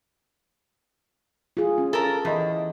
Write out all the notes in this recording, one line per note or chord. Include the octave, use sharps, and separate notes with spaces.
F4 G#4
C#4
A4 A#4
E2 E3 D#5